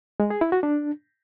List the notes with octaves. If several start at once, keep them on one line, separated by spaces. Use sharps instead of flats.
G#3
G#4
E4
F#4
D4